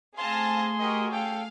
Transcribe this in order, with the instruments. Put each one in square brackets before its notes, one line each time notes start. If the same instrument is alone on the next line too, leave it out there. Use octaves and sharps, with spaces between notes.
[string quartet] A3 G#4 [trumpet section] C4 G#5 [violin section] F5 A5 A#6 [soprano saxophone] C6
[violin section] F#4 G4 [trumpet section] A#4 D#5
[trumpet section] C#4 A4 G5 [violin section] F5